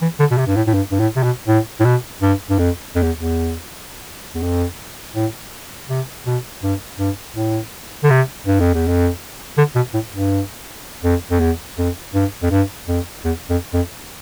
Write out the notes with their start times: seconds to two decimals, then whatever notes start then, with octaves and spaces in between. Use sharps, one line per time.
0.02 E3
0.19 D3
0.31 B2
0.38 C3
0.47 G2
0.56 A2
0.67 A2
0.74 G2
0.92 G2
1.00 A2
1.16 C3
1.23 B2
1.48 A2
1.80 A2
1.85 B2
2.22 G2
2.50 G2
2.59 F2
2.95 F2
3.03 E2
3.19 E2
4.35 E2
4.42 F2
5.15 A2
5.89 C3
6.26 B2
6.63 G2
6.99 G2
7.36 A2
8.04 D3
8.10 C3
8.47 G2
8.60 F2
8.74 E2
8.88 F2
9.57 D3
9.75 B2
9.94 A2
10.13 G2
11.04 F2
11.31 F2
11.40 E2
11.78 F2
12.14 G2
12.43 F2
12.51 G2
12.88 F2
13.25 E2
13.50 F2
13.74 F2